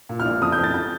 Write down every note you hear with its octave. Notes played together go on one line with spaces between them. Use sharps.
A#2
F6
A#1
F2 D#6
G6
F2
A6
G6